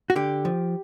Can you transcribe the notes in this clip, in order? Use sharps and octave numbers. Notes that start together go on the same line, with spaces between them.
F#4
D3 G4
F3